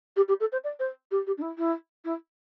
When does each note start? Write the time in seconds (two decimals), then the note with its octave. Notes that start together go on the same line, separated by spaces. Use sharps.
0.16 G4
0.28 G4
0.40 A4
0.52 C5
0.64 D5
0.79 C5
1.11 G4
1.26 G4
1.37 D4
1.41 E4
1.58 E4
2.05 E4